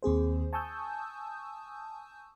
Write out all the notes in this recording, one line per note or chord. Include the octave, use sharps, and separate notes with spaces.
D#2 C4 G#4 C5
G#5 A5 C#6 D#6 E6 G6